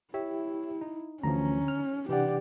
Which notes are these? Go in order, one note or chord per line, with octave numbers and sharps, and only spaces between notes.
E4 G4 C#5 E5
D#4
D2 D3 E3 F3 C#4 A#5
F6
C3 E3 D4 G4 D5 F#5